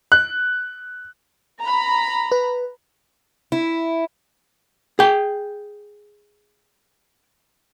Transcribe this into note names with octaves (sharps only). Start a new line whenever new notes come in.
F#6
A#5 B5
B4
E4
G#4 G5